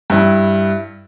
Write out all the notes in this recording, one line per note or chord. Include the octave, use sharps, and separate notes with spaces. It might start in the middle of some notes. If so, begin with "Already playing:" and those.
G2 E4